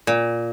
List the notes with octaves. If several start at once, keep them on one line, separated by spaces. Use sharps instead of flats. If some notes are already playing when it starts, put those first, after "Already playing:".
A#2